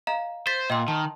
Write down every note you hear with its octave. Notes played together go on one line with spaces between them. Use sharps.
D#5 F5 A#5
C5 A6 B6
A#2 D#5 G5 C6
D#3 A5